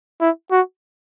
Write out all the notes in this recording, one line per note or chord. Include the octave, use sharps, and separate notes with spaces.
E4
F#4